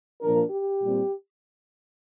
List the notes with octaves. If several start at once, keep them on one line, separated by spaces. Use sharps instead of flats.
A#2 F3 A#3 D4 A#4
G4
A#2 G3 C4